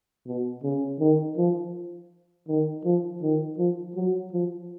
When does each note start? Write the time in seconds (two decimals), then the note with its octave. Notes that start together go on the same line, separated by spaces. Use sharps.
0.26 B2
0.63 C#3
0.99 D#3
1.37 F3
2.48 D#3
2.85 F3
3.22 D#3
3.58 F3
3.95 F#3
4.32 F3